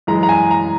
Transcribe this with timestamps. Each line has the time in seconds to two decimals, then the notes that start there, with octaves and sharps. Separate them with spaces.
0.07 F#2 E3 G#3 A#5
0.23 A#5
0.29 G#5
0.51 A#5